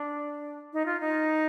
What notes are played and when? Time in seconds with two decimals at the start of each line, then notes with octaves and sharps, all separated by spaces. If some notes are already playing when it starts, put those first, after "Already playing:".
Already playing: D4
0.73 D#4
0.86 F4
1.00 D#4